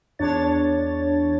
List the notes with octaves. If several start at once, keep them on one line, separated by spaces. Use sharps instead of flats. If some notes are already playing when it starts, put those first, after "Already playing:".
E2 D4 C#5 A6